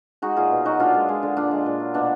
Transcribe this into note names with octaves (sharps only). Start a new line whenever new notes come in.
G#3 D#4 F#4
A#2 F4 G#4
B2
F#3 D#4 F#4
A#2 D4 F4
G#3
G#3
D3
A#2 D4 F4
G#3
A#2
F#3
B2 A#3 D4